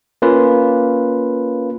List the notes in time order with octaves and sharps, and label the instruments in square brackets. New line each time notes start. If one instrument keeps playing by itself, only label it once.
[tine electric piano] A#3 C#4 F4 B4